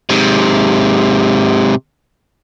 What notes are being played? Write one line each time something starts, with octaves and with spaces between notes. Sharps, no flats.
G#2 C3